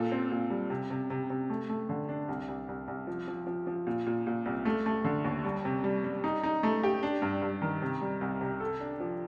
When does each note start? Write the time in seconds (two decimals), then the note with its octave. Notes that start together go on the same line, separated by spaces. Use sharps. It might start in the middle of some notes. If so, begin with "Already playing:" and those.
Already playing: A#2 A4
0.12 C4
0.31 A#2
0.50 G3
0.70 C3
0.90 C3
1.10 C3
1.30 C3
1.50 A3
1.69 A3
1.89 D3
2.09 D4
2.29 C2
2.48 C2
2.69 C2
2.88 C2
3.07 F3
3.28 F3
3.47 F3
3.67 F3
3.87 A#2
4.06 A#2
4.27 A#2
4.46 C2
4.65 A3
4.86 A3
5.04 D3
5.24 D#2
5.45 G3
5.65 C3
5.84 G3
6.04 G3
6.24 D#4
6.43 D#4
6.63 A3
6.83 G4
7.03 D4
7.22 G2
7.42 G2
7.62 D#3
7.82 C3
8.01 G3
8.21 C2
8.41 C3
8.60 A4
8.80 D4
9.00 F3